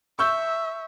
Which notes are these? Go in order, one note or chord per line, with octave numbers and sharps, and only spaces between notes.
E5 C#6 E6 G6